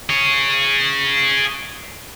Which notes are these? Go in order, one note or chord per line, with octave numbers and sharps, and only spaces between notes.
G#4 C#5